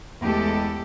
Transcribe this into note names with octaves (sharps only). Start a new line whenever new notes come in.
E2 G#3 A3 G4 A4